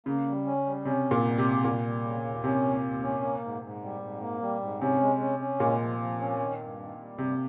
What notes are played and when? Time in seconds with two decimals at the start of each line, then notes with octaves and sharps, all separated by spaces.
0.06 C#3 A#3
0.27 G3
0.46 C#4
0.66 G3
0.85 C3 C#4
1.06 G#2
1.11 A#2
1.25 G3
1.38 C3
1.45 G#2
1.64 A#2 G3
1.84 G3
2.04 C#3
2.24 D#2
2.44 C3 C#4
2.63 D#2
2.83 D#2
3.03 C#4
3.23 A#3
3.42 G#2
3.62 G#2
3.82 G3
4.01 G#2
4.21 A#3
4.41 G3
4.61 G#2
4.81 C3 C#4
5.01 G#3
5.20 C#4
5.40 C#4
5.60 A#2 G#3
5.80 F3
6.00 F3
6.19 C#4
6.39 D#3
6.59 G2
6.79 D#3
6.99 G3
7.18 G2 C3